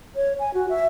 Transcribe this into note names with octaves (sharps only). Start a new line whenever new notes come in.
C#5
G#5
F#4
E5